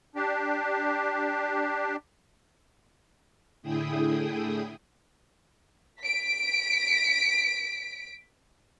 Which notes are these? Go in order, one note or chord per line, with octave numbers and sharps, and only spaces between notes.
D4 G4
A2 D3 E4 G#4 G5 D#6
B6 D7